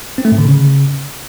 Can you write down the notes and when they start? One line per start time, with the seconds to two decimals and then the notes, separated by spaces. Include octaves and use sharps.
0.18 C4
0.25 A3
0.32 A2
0.38 D3
0.45 C#3